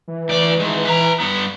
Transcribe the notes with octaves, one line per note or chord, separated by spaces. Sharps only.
E3
D2 D5
D#3 G#3
B4 A#5
G2 B3